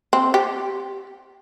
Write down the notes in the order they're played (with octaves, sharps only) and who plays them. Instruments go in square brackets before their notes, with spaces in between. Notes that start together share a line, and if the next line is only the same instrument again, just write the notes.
[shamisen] C4
G4